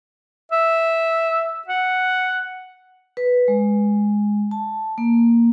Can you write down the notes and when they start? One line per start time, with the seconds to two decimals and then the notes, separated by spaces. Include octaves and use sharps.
0.52 E5
1.68 F#5
3.17 B4
3.48 G#3
4.51 A5
4.98 A#3